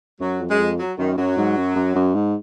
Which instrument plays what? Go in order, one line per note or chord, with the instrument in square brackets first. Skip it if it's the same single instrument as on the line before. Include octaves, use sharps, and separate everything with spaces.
[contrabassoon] F#2 [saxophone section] F#3
[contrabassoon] F2
[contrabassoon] F#2 [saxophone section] G#3
[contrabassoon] F2
[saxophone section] F#3
[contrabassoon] F#2 [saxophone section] D#3
[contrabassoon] F#2 [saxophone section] F#3
[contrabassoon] G#2
F#2
F#2
F#2
G#2